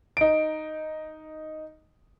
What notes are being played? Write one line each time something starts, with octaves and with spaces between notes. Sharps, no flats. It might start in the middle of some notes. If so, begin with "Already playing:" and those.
D#4 D7